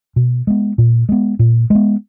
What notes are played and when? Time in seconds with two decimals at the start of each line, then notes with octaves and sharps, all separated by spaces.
0.16 B2
0.47 G#3 B3
0.78 A#2
1.09 G#3 B3
1.39 A#2
1.70 G#3
1.75 B3